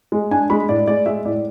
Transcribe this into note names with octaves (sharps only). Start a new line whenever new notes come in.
G#3
D4 G#5
G#3 B5
A2 D5
G#3 D5
G#3 E5
A2 D5